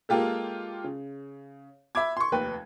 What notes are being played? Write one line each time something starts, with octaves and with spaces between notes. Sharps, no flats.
G#3 A#3 F4 G4 A4
C#3
E5 B5 D6 G#6
C6 C#6
F1 D#2 B4 G5